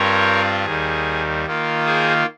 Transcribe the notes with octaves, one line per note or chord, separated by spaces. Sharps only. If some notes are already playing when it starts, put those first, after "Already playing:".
Already playing: G2 G3 C4 F4 A#4 C#5
D#2 D#3 G3 G#4
D#3 A#3 F4
G#4 C5